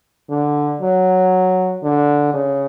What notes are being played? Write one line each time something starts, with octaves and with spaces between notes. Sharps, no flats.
D3
F#3
D3
C#3